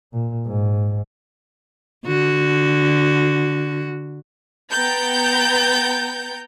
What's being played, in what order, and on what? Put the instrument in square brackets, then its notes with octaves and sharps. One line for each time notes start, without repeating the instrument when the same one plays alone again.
[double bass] A#2
G#2
[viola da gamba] D3 F#4
[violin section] B3 G5 A#5 G6 A6